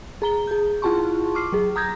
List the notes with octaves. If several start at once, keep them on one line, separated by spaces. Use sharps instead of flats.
G#4 A#5 G7
G#4 G6
E4 F4 G#4 A5 C6 C#6
C#6 D6 F6 C7
F#3 G#4
A#5 D#6 G6 G#6 A#6